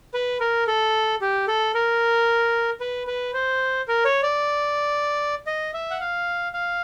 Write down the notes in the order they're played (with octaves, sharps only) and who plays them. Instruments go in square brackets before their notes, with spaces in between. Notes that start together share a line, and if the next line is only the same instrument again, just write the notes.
[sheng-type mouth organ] B4
A#4
A4
G4
A4
A#4
B4
B4
C5
A#4
C#5
D5
D#5
E5
F#5
F5
F5